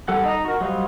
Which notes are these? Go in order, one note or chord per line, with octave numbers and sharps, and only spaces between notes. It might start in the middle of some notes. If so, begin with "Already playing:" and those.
G3 A4 F#5
D#4 D#5 A#5
F#4 A#4
F#3 G3 C5 D#5 F5